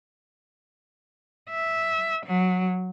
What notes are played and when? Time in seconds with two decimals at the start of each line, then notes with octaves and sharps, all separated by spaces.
1.50 E5
2.26 F#3